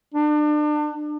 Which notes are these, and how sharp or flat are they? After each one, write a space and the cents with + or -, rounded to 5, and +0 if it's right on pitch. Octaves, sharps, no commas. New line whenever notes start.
D4 +35